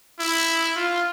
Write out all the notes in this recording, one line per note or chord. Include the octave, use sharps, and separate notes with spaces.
E4
F4